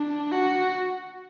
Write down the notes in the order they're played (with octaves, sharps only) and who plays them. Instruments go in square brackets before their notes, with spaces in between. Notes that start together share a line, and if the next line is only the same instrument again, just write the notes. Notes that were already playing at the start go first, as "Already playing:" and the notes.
Already playing: [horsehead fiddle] D4
F#4